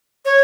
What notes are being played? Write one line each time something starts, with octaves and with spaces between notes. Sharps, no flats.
C#5